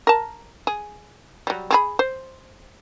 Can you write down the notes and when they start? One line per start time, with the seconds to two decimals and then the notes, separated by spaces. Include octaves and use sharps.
0.07 A#4 A5
0.67 G#4
1.47 F#3 G3
1.71 C4 G#4 B5
1.99 C5